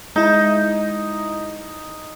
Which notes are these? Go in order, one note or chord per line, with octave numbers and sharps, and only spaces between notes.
G#3 D#4 E4